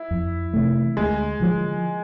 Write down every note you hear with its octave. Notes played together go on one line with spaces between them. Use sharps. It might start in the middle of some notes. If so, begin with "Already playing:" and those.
Already playing: E4
F2
C3 E3 A3
D2 G#3
D3 F3 G#3